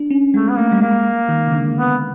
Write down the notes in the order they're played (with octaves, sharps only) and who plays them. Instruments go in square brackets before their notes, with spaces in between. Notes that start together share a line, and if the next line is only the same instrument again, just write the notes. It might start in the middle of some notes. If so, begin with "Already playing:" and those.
Already playing: [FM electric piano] D4
C#4
[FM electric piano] G#3 [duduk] A3
[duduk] B3
[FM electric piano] A3 [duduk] A#3
[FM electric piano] G3
[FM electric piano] G#3 [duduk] A#3
[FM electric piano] D#3
C#3
D3
[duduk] B3